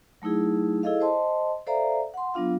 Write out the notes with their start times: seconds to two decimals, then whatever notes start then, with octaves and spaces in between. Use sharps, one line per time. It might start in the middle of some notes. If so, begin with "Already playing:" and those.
0.22 F#3 A3 D#4 E4 G#4
0.83 E4 G#4 A4 D#5 F5
1.00 C5 D#5 A5 C6
1.67 A4 C5 D5 E5 F5 A#5
2.14 F#5 C6
2.34 F#3 B3 D4 F4 F5